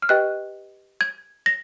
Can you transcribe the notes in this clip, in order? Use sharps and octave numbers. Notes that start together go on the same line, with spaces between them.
F6
G4 B4 D#5 G5 F#6
G#6
A#6